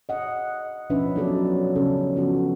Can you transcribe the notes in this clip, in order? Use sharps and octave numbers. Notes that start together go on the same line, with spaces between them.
D#5 F#5
B2 F3 C#4 D4 B4 E5
F#3 B3 D#4 A4 D5
C#3 C#4 A4
F3 B3 F#4